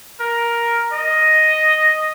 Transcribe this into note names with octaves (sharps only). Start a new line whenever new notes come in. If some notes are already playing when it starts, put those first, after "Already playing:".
A#4
D#5